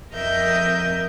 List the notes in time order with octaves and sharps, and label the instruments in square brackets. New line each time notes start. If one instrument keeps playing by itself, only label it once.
[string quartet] F2 A#4 D#5 E5 G6